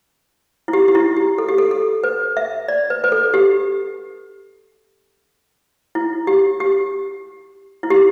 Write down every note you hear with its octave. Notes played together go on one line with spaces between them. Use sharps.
E4
G4
G4
E4
G4
A4
G4
A4
A4
B4
E5
D5
B4
B4
A4
G4
E4
G4
G4
E4
G4